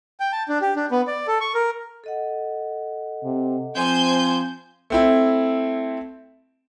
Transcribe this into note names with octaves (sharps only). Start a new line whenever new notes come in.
G5
A5
D4
G4
D4
B3
D5
A4
C#6
A#4
A4 D#5 F#5
C3
F3 C4 C5 G#5 G6
A3 C4 E4